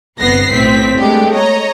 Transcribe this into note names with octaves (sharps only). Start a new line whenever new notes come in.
G1 C2 B3 B4 A#6 C7
B1 A2 C4 B6
G#3 A3 B3 D4 G4
C#5 D#5 A#5